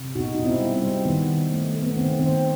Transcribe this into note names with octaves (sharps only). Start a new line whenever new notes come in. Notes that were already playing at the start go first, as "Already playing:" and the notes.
Already playing: C3
B2 D#4 F#4
B2 D#4
C4 E4
G3
C4
G3
D#3 B3
D#3
A3
A3
B3
D#3 C4
D#3 C4